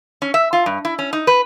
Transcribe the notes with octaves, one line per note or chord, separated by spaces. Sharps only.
C#4
E5
F4
G2
E4
C#4
D#4
B4